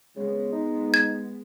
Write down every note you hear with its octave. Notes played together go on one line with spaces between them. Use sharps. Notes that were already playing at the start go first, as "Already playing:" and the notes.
C#3 G#3 B3
D#4
G#6